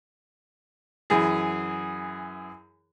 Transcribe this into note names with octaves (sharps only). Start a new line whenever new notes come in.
F#2 E3 G#4